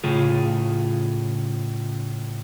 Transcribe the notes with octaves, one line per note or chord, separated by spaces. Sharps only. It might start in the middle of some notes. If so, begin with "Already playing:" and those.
A2 C#3 F4 G#4